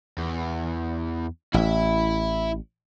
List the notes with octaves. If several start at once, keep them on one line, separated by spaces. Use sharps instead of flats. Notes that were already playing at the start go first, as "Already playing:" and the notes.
E2
A1 E4 E5